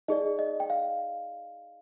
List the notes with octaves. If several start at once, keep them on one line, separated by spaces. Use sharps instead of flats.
D#4 G#4 D5 D#5
D#5
G5
F5